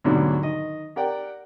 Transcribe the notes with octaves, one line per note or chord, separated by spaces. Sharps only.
D2 G#2 B2 F#3 G3 D4
D#3 D#5
G4 A#4 D5 F#5 G5